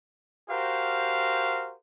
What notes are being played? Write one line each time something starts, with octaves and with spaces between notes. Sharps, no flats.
F#4 G4 A#4 C5 F5